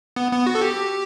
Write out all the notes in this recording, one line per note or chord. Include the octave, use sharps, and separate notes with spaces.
B3
B3
F#4
A4
G4